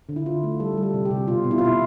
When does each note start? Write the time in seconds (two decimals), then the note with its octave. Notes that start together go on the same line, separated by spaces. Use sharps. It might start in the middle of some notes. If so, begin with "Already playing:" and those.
0.09 D3
0.16 E4
0.26 D3 F4
0.43 A3
0.60 G3 A4
0.77 G3
0.83 A4
0.94 C3
1.05 G4
1.11 C3
1.28 B2 F4
1.44 B2
1.51 E4
1.58 F4
1.61 B2 E4